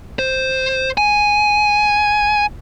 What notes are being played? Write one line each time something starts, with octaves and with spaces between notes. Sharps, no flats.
C5
G#5